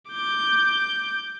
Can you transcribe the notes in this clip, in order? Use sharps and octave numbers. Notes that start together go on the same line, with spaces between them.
D6 G6